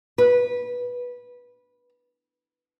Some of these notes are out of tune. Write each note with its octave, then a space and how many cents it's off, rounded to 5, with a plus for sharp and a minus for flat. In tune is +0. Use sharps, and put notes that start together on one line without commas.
B4 -15